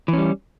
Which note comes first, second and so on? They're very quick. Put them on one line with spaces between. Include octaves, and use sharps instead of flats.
E3 C#4 G3